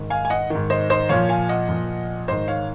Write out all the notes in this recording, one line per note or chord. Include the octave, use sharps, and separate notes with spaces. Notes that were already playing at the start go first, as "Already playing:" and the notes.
Already playing: G#2 D#3
F5 G#5
G#5
D#5 F#5
G#2 D#3
C5 D#5
C5 D#5
A#2 F3 C#5 F5
F5 G#5
D#5 F#5
A#2 F3
G#2 D#3 C5 D#5
C#5 F5